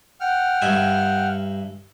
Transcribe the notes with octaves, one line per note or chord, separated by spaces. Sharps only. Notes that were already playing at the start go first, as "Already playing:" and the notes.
F#5 G5 F6
G2 E5 G#5